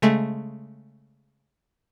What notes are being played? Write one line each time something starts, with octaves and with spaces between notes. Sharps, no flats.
C#3 G#3 A3